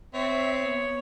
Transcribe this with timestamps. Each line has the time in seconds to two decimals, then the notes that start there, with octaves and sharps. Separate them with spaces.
0.14 C4 C#5 E5
0.62 B3